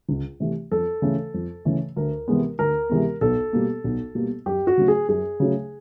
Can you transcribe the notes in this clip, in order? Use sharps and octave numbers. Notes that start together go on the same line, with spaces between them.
C#2
C3 E3 A3
F2 A4
C#3 E3 A3
F2
C#3 E3 A3
D2 A#4
C3 E3 G#3 B3
D2 A#4
C3 E3 G#3 B3
B1 A4
B2 G3 A#3
B1
B2 G3 A#3
F#2 G4
F#4
C#3 F#3 A3
G#4
F#2 G#4
C#3 F#3 A3